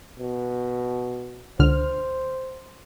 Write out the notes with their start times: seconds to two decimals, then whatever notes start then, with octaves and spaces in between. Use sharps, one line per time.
0.19 B2
1.59 C#2 D3 C5 F6